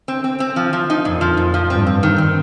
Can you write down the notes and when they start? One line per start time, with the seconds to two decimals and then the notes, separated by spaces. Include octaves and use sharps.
0.08 C4
0.24 C4
0.40 C4
0.56 F3
0.73 F3
0.90 D#4
1.05 F2 A#2
1.21 F3
1.37 A#2
1.54 F3
1.70 G2 C4
1.87 C4
2.03 D#3
2.18 C4